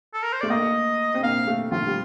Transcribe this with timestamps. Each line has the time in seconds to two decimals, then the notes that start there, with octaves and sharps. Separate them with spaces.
0.13 A4
0.23 A#4
0.32 C5
0.41 A3 D5
0.50 A#3 D#5
1.14 C4
1.23 A#3 F5
1.47 A3
1.71 F3 F4
1.87 G3